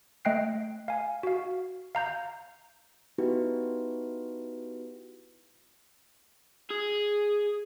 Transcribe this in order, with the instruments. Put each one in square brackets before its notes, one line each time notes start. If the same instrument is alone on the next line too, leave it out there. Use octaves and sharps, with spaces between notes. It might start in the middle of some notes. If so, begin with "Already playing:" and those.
[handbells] A3 D#5 G5 F#6 C7
F5 G#5
F#4 F5
F5 A#5 G6
[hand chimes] B3 D#4 E4 F#4 G4 B4
[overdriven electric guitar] G#4